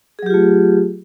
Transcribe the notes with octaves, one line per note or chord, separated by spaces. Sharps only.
F#3 A3 F4 G4 G#4